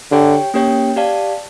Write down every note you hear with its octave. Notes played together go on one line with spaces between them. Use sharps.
D3 G4 C#5 G5
A#3 C#4 G4 C#5 G5
G4 D5 F5 A5